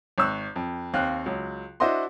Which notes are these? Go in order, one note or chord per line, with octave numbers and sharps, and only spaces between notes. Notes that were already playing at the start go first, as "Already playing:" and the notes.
G#1 C#6 E6 F#6
F2
D#2 C4 F5 F#6
C#2 F#3
D4 E4 F#4 C5 D#5 C6